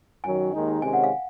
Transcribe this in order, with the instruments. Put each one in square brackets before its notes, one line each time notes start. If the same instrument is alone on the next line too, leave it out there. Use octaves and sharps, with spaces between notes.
[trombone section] F#2 D#3 F#3 [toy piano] G#5
[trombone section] D#2 D#3 G#3 D#4
[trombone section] C3 D#3 G#3 C#4 [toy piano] G#5
[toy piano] F#5
F5